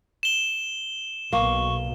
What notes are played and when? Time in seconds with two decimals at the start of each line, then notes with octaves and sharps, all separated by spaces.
0.23 E7 G7
1.33 B1 B2 A#3 C#6